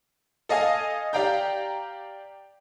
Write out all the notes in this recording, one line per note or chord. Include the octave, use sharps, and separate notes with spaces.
A4 D#5 F5 G#5 D#6
G4 D5 F5 G5 A#5 G6